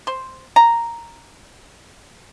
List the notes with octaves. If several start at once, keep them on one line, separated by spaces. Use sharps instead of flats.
C5
A#5